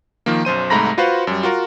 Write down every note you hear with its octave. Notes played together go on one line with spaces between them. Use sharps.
D#3 F3 A#3
B1 F#2 C5 D#7
C2 G#2 A3 A#5 B5 A#6
F4 F#4 B4 C5 F5 F#5
F#2 G3
F4 F#4 A#4